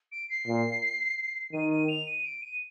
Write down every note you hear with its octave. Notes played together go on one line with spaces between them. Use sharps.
D7
C7
A#2
D#3 D#7
D#7
F7
D#7
D7
D#7